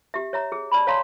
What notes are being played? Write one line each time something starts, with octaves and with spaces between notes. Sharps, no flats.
G4 E5
C#5 E5 A#5
G#4
D5 A5 B5
C#5 F5 A5 A#5 C6